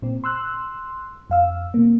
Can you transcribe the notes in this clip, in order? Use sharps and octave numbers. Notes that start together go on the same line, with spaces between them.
A#2 C4
C6 E6 F#6
F2 F5 E6
C3 A#3